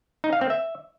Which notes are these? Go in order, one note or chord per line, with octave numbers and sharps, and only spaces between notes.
D#4
F5
C4
E5